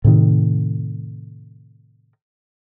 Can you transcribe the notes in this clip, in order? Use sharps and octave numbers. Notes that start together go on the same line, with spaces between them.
A2 C3 D#3